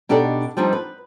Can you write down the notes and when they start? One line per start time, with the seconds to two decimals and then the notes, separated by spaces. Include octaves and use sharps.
0.09 B2 D4 D#4 G4 A4 D5
0.57 F3 G3 C4 D4 D#4
0.73 B4